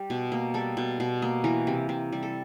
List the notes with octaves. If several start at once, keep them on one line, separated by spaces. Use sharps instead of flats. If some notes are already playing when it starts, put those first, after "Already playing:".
Already playing: G3 G4
B2
A#3
G3 A4
B2
B2
A#3
E3 A#4
C3
C3
G3
A4